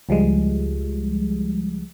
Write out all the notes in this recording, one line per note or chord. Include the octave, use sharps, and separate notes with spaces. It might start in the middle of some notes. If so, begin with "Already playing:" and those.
C#2 F3 G3 G#3